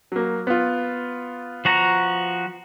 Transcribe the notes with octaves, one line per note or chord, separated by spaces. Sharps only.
F#3 A#3
B3 F4
F3 F#4 A#5